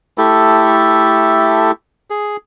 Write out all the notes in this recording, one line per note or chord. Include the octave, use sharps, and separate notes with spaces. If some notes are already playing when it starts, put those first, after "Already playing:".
A3 E4 G4 A4
G#4